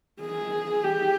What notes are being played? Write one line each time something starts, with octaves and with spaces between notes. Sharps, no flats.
G#4
G4